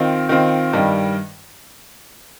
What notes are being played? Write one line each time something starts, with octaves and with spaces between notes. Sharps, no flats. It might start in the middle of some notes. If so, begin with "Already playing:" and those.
Already playing: D#3 C4 F4
D#3 C4 F4
G2 D#3 G3